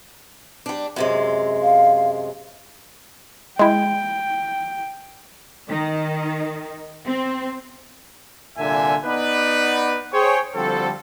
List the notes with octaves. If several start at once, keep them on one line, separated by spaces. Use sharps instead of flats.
G3 D4
F#2 C3 G#3
F5
G#3 E4 G5
D#3
C4
C2 A#2 D3 E5 G#5
B3 D#4 B4 D5
G#4 C5 C#5 G5
D3 F3 G3 C4 F#4 A4